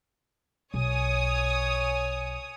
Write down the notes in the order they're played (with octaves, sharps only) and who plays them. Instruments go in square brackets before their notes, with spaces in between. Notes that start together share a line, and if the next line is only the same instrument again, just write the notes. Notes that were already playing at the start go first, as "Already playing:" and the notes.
[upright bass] B1 [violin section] C#5 G#5 D#6